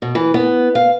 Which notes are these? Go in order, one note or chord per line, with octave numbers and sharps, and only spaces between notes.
B2
E3
B3
F5